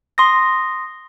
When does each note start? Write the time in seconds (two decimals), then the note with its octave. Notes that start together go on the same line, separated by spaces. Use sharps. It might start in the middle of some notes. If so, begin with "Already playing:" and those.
0.18 C6 D#6 A#6